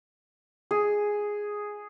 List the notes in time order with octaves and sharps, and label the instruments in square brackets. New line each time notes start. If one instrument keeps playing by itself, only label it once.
[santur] G#4